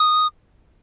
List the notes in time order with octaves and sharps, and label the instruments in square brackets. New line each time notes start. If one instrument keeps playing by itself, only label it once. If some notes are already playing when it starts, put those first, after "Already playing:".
Already playing: [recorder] D#6